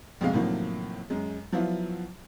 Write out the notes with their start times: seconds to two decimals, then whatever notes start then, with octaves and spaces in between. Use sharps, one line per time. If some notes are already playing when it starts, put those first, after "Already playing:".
0.21 A#1 F2 B2 G#3 F5
0.33 A2 C3 D#3 F3 F#3 A#3
1.10 F#2 G#3
1.52 F3 F#3 B3 E4 F4